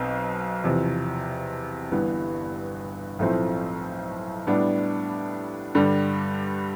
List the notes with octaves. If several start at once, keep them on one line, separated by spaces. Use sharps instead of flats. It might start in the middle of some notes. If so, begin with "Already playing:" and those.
Already playing: B1 B2 C4
E2 C3 F3
G1 G2 E3 B3
B1 A2 F3 A3 C4
A2 G3 B3 D4
G2 D3 G3